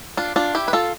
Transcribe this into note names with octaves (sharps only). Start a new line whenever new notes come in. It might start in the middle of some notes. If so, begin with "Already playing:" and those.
D4 F4
D4 F4
E4 G4
B4
F4 A4